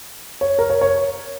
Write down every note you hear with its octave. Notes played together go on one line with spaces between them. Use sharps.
C#5
A#4
C#5
C#5